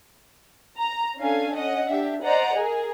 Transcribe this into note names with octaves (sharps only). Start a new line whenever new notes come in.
A#5
C#4 D4 A4 F5 G#5
C#4 D#5 F#5
D4 G4 E5
C5 D5 D#5 F#5 A#5
G#4 A#4